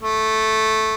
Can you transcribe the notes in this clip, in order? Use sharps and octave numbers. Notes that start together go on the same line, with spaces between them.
A3